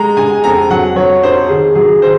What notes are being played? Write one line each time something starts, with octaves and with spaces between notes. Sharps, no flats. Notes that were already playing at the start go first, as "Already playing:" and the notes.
Already playing: G#3 A#5
G#3 G#5
F2 A#5
F#3 F#5
F#3 C#5
D#4 C5
D#3 G#4
F#3 G#4
D#3 C5